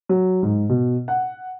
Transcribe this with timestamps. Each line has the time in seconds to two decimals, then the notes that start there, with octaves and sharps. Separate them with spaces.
0.09 F#3
0.43 G#2
0.69 B2
1.08 F#5